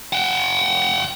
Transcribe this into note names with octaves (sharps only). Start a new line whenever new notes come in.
F#5 G5